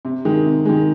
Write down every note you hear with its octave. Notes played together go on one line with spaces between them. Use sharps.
C3
D#3 G#3
C3
D#3 G#3